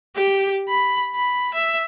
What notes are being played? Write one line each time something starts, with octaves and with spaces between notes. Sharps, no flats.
G4
B5
B5
E5